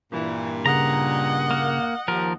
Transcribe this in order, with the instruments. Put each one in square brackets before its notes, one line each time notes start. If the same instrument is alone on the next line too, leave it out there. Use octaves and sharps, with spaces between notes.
[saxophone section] G2 A#2 [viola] E3
[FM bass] C#3 [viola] D#5 F#5 [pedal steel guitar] A#5
[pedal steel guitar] A#3
[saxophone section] D#2 [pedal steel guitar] F3 A#4